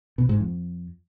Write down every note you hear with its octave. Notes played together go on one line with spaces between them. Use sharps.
B2
G#2
F2